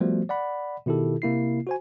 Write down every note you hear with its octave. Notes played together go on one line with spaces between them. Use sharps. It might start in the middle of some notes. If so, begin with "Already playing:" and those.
F3 G3 A3 B3 F#4 C5
D5 F#5 B5
B2 D#3 E4 G4 A4
C3 A#3 E4 C7
F#4 C5 G#5